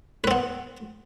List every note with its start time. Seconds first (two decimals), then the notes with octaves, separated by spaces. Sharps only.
0.24 B4
0.27 C4
0.31 B3